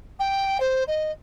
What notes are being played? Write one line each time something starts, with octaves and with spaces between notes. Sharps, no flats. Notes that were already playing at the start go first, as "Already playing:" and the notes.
G5
C5
D#5